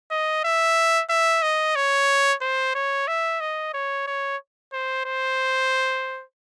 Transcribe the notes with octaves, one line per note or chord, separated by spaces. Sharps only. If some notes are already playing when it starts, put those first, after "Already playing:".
D#5
E5
E5
D#5
C#5
C5
C#5
E5
D#5
C#5
C#5
C5
C5